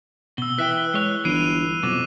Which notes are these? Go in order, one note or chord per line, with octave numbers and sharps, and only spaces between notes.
B2 E6 G7
E3 B4 E5 G5 F#6
G#3 C#5
G1 E3 C7 D#7 F7
F7
F2 B2 F#3 D6